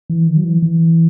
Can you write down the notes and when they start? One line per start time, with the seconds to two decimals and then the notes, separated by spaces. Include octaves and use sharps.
0.10 E3
0.27 D#3
0.37 F#3
0.44 E3
0.62 E3